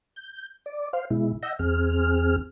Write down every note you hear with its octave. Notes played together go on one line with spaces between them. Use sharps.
G6
D5
C5 F5
B2 G#3 E4
D#5 F#5 E6 G6 A#6
E2 C4 G#4 F6